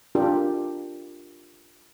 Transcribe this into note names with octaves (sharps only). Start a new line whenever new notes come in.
D4 F4 G4 A#4